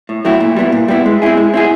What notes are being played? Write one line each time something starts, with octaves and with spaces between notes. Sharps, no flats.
A2
F#3 A3 C4 E4
A#2
G3 B3 E4
A#2
G3 B3 E4
G#3
C4 E4 G#4
G#3
C4 E4 G#4